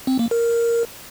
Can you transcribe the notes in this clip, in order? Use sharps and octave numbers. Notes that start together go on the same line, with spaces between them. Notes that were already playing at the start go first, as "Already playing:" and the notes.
C4
A#3
A#4